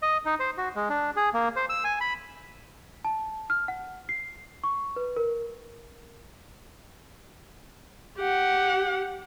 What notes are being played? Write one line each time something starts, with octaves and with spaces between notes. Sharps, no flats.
D#5
D#4
C5
F#4
G#3
D4
G#4
A#3
C5
E6
G#5
B5
A5
F6
F#5
C7
C#6
B4
A#4
G4 F#5